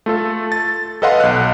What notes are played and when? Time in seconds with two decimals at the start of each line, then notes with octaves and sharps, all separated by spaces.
0.06 A3 F4 A4
0.52 A6
1.02 A4 B4 D#5 F5 F#5 C6
1.20 B1 F#6